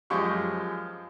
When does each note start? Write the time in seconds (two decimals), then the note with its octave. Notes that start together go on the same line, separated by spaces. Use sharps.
0.10 F#2 F3 G#3 G4 C#6